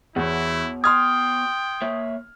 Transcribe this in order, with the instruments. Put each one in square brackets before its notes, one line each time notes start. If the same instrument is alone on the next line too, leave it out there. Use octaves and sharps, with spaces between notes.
[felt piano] E2 [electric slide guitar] B3 F#4 C#5 [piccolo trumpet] E4
[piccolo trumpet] G5 [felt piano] C6 F6 G#6 [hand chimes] D#6
[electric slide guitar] A#3 C#5 E5